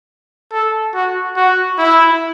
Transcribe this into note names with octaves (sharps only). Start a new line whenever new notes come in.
A4
F#4
F#4
E4